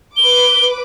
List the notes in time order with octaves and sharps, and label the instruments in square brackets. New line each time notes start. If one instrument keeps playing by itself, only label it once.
[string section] B4 D6 [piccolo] G7